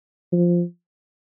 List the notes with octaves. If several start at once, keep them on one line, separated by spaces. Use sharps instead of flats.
F3